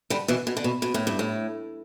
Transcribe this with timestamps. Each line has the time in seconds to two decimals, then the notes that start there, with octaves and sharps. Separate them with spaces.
0.10 D3 G3
0.28 B2 E3
0.47 B2
0.57 D3
0.64 B2
0.82 B2
0.94 A2
1.07 G2
1.19 A2